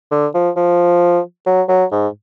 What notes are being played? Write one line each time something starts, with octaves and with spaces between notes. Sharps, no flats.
D3
F3
F3
F#3
F#3
G#2